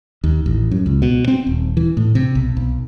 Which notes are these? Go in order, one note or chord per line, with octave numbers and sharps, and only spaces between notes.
D#2
A1
F#2
C#2
B2
C4
D#1
E3
A2
C3
B1
B1